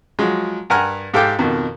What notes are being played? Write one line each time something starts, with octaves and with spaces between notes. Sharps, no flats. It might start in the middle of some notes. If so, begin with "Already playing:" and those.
F3 F#3 G#3
G2 A#4 F#5 G#5 A#5 F6
G#2 G4 A4 F5 G5 D6
F2 B2 D#3